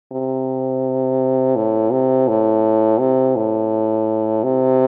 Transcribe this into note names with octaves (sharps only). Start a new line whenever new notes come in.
C3
A2
C3
A2
C3
A2
C3